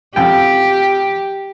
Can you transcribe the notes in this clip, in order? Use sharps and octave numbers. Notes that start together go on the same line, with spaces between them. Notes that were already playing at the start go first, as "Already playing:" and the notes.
F2 G4 G5